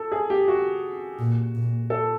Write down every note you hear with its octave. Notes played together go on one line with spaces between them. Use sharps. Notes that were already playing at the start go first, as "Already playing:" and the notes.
Already playing: A4
G#4
G4
F#4
A#2
A#2
A4